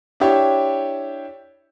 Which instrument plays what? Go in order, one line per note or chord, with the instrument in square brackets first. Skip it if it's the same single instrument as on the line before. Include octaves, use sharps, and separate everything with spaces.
[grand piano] D4 E4 G4 C#5